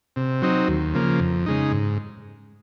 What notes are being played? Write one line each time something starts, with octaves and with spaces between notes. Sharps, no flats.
C3
F#3 C4 D#4
D#2
C#3 F3 A#3
F2
C#3 G#3 D#4
G#2